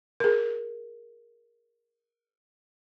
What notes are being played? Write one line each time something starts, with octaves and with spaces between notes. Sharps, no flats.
G#4 A#4